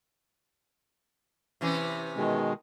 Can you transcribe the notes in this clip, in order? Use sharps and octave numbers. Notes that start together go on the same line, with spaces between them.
C3 E3 C#4
B2 D#3 G#3